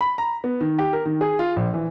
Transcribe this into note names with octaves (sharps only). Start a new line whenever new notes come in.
B5
A#5
B3
D#3
G4
A#4
D#3
G#4
F4
A#1
E3